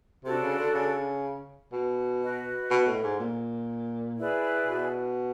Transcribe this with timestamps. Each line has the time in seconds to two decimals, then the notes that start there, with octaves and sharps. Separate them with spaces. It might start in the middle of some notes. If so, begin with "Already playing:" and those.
0.25 C3 D4 F#4 A4
0.42 C#3
0.58 D3
0.74 C#3
1.72 B2
2.22 F#4 B4 D#5
2.71 B2
2.87 A2
3.04 G#2
3.20 A#2
4.18 E4 G#4 B4 D5
4.67 B2